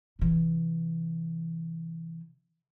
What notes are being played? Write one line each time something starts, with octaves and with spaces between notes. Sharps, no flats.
C3 E3